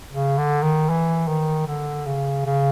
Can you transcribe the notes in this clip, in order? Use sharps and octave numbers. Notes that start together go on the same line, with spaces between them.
C#3
D3
D#3
E3
D#3
D3
C#3
C#3